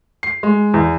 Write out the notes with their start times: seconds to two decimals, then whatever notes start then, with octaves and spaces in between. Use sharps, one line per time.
0.23 C7
0.43 G#3
0.74 E2